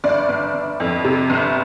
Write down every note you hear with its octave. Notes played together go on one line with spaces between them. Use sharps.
G1 D5
G1
G1
F2
C3
G1